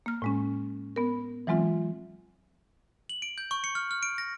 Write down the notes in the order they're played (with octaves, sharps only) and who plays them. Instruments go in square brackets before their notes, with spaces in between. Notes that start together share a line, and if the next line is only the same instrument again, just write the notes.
[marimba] A#3 F6
A2 G#3 C#4
B3 A#4
E3 F#3 G#3 C4 F4 E5
[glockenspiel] F#7
D7
G6
C#6
C#7
F6
F6
D7
A#6